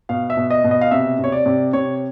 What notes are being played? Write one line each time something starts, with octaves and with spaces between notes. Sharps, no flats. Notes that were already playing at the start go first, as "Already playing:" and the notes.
B2 F5
E5
B2
D#5
B2
D#5
F5
C3 E5
C3 C#5
D5
C3
C3 C#5